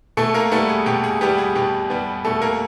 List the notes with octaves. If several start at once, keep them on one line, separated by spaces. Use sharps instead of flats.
B2 A3 A4
A#3 A#4
G3 A3 B3 A4
G#4
B2 G4
G#4
G3 B3 G4
G#4
B2 G4
G3 B3
B2 A3 A4
A#3 A#4